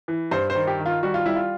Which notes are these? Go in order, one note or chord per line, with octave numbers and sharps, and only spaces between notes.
E3
G2 C5
C5
D#3
G4
D#3
F4
G3 F#4
F4
G3 E4
F4